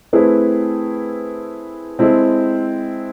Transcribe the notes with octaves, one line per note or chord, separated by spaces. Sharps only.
A3 C4 E4 G#4 B4
G#3 C4 E4 A4